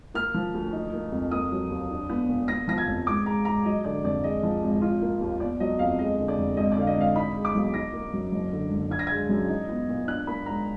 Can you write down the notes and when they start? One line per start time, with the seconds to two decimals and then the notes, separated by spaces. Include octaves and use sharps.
0.14 A#3 F6
0.34 F3
0.54 D2
0.73 D#4
0.93 A#3
1.12 F2
1.31 A#3 D#6
1.52 F#3
1.70 D#2
1.90 D4
2.09 B3
2.29 A#2
2.48 B3 A#6
2.68 F3 A#6
2.78 G#6
2.87 F1
3.07 G#2 D6
3.26 G#3 A#5
3.45 G#2 A#5
3.65 F#3 D#5
3.84 D3 D5
4.04 F1 D5
4.23 G#3 D#5
4.43 F3
4.62 G#1
4.82 F4
5.02 A#3
5.20 D#2
5.40 B3 D5
5.60 F#3 D#5
5.79 F2 F5
5.99 G#3 D#5
6.19 D3
6.28 D5
6.38 F1
6.57 G#1 D#5
6.72 D5
6.76 D3 F5
6.87 D#5
6.96 G#1
7.01 F5
7.16 D#4 B5
7.36 G#3
7.45 D6
7.55 B1
7.74 D#4 A#6
7.93 A#3
8.13 F#2
8.32 F#1
8.52 D3
8.71 F#1
8.90 D4 G#6
8.99 A#6
9.07 G#3 G#6
9.29 F#2
9.49 D#4
9.69 B3
9.88 A#2
10.07 D4 F#6
10.27 A#3 B5
10.46 G#2 A#5